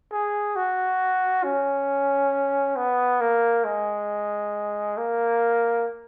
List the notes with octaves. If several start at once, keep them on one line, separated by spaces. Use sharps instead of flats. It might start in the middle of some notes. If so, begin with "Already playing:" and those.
G#4
F#4
C#4
B3
A#3
G#3
A#3